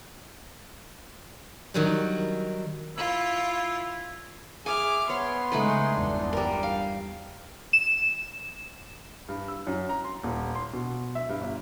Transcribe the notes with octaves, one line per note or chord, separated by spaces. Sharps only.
D#3 F#3 G3
E4 F4
G#4 E5 G#5 D6 F6
B3 C#5 C6
C#3 G#3 A3 D#4 B4
G1 E2 D4
G3 A#4
F5
E7
G2
E6
F#2
A#5
C6
D#1
C6
B2
E5
G2
G1